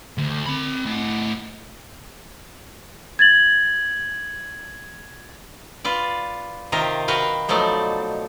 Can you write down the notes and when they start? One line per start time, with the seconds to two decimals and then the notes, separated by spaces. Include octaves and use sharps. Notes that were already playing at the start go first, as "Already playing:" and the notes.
0.18 D2
0.47 C4 B5
0.86 A2 F#5
3.19 G#6 A6 F#7
5.84 F4 B4 D5
6.72 C3 D#3 F4 G4 A#4 A#5
7.08 F#4 A#4 B4 F5 G5
7.48 B2 F3 F#3 A3 D#4 D5